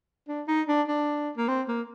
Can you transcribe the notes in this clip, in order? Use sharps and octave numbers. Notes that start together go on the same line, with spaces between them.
D4
D#4
D4
D4
A#3
C4
A#3